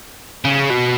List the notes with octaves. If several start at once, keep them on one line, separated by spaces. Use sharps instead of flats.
C#3
B2